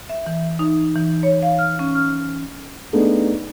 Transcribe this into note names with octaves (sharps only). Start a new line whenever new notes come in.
E5
E3
D#4
E3
C#5
F5
F6
C#4
F6
A3 B3 D4 D#4 G#4